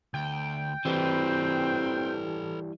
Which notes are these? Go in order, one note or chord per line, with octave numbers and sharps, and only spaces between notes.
D2 G5
E3 G3 C4 A4 B4